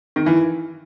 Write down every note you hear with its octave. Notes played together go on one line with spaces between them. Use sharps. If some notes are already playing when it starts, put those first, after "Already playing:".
D#3
E3